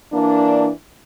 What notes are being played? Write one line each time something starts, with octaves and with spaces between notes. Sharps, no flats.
E3 A#3 D4